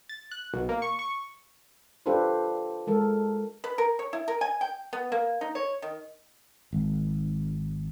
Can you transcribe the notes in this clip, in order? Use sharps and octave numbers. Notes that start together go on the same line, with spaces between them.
A6
F#6
B1
A#3
C#6
C#6
D4 F4 G4 A4 B4 C5
G#3 A4 A#4
B4
A#4
C#5
E4
A#4
G#5
G5
B3
A#3
D#4
C#5
D#3
G#1